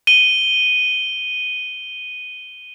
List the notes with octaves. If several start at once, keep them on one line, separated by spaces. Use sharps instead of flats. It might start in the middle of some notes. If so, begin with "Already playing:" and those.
D#7 G7